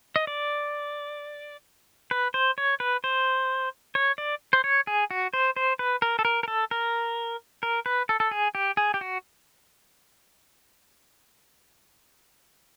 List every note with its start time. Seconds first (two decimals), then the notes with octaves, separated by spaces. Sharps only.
0.16 D#5
0.27 D5
2.11 B4
2.34 C5
2.58 C#5
2.80 B4
3.04 C5
3.95 C#5
4.18 D5
4.53 C5
4.64 C#5
4.87 G#4
5.11 F#4
5.34 C5
5.56 C5
5.79 B4
6.02 A#4
6.19 A4
6.25 A#4
6.43 A#4
6.48 A4
6.71 A#4
7.63 A#4
7.86 B4
8.09 A4
8.20 A4
8.31 G#4
8.55 G4
8.77 G#4
8.94 G4
9.01 F#4